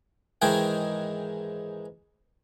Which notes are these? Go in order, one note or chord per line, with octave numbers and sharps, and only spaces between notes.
G#2 D#3 E3 G#3 G#4 G5